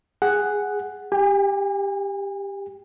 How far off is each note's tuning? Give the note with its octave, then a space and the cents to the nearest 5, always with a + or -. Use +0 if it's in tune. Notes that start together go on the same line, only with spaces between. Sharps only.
G#4 -10 F#5 +5
G4 +10 G#5 -40